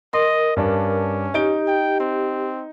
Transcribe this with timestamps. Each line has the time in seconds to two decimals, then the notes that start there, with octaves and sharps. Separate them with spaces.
0.14 A#4 D#5 C6
0.57 G2 C#4 D4
1.34 D#4 G4 D7 G7
1.68 G5
2.00 C4